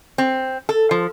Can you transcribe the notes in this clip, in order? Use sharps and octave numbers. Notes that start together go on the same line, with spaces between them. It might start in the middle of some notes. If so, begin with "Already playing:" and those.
C4
A4
F3